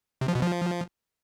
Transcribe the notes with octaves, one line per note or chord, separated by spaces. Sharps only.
C3
F3
B2
F3